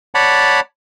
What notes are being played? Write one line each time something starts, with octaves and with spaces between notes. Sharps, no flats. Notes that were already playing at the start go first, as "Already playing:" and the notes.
C#5 D5 F#5 A5 B5